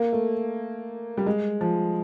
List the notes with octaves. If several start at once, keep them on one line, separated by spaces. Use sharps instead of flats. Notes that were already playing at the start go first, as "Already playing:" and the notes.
Already playing: A#3
A3
G3
G#3
F3